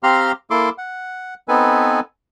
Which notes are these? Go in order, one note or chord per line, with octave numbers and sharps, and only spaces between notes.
C4 G4 F5 A#5 C6 F6
A#3 E4 A4 C6 D6
F#5
B3 C4 D#4 A4 B4 G#5